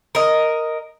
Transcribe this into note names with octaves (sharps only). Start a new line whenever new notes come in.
A#4 D#5